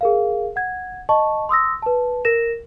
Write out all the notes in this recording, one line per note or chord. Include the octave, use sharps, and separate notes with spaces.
G#4 A#4 F5
F#5 G#6
D#5 A5 C#6
C6 D#6 E6 A#6
B4 A5
A#4 A#6 E7